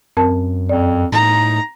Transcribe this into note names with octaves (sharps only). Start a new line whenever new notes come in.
F#2 C4 A#4 A5
F2 D5
A2 D#4 A#5